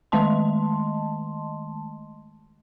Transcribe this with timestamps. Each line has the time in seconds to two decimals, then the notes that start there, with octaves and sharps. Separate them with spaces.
0.12 D#3 G#3 A3 D#5 A5 C6